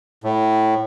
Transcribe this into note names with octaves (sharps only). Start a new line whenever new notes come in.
A2